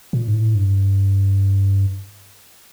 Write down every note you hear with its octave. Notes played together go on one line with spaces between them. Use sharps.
A#2
G#2
A2
G2